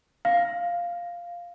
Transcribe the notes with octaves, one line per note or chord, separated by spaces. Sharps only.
F5